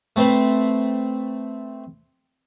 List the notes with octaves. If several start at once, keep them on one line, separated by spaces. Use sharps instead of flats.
A3 C4 B4 C5